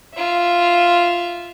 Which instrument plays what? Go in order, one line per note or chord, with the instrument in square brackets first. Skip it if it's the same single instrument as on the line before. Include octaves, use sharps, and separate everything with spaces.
[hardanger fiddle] F4 E5